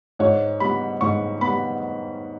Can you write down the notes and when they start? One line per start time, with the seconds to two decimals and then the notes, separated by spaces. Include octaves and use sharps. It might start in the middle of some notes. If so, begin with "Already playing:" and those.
0.19 G#2 C#5
0.60 G3 B3 B5
1.01 G#2 C#6
1.41 G3 B3 B5